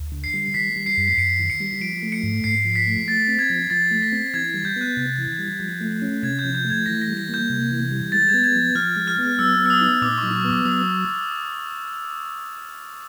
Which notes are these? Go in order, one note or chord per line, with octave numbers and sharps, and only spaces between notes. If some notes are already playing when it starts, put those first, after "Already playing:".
Already playing: D2
D3
C7
G3
D#3 B6
G3
C7
F#2
C7
F#2 C#7
D#3
C#7
G3
F3 D7
A3
C#7
G#2
G#2 C7
F3
B6
A3
A3 A6
C4
G#6
F3
F3 A6
A3
A#6
C4
E3 G#6
G3
G6
B3 F#6
C3
E3
G3
F3
A3
C#4
C3 G#6
G6
F3
G6
A3
G#6
E3 A#6
A#6
G3
A#6
A#3 G6
C3
E3
G3
G#3 A6
G#6
B3
G#6
F3
F3 F6
G#3
F6
B3
F#3 E6
B3
E6
D#6
D#4
A#2 D6
C#6
F#3
C#6
B3
D6
F#3 D#6